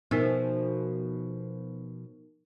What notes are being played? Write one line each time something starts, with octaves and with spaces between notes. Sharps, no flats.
B2 F3 B3 D#4 A#4